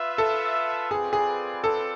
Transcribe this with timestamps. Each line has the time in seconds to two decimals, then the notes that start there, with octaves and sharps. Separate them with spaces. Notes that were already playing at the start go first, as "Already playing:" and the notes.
Already playing: F4 B4 E5
0.18 A4
0.91 C4 F4 G#4 B4 D5
1.13 G#4
1.64 A4